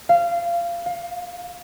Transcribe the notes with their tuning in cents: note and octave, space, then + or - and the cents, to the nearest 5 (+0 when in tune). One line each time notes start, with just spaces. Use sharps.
F5 -20
F5 +25